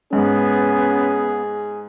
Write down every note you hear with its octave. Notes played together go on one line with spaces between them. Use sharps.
G#2 B3 C#4 G#4